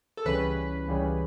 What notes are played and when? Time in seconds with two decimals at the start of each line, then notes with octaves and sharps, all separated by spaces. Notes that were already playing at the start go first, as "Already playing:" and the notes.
0.17 A4
0.25 C#2 C#3 E3 G3 C#4 B4
0.88 C#2 C#3 E3 G3 C#4